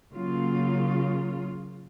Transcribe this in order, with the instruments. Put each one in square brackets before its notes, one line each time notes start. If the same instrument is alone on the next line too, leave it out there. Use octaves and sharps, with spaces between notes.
[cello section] C#3 F#3 A#3 F4